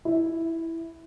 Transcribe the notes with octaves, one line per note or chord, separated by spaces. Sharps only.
E4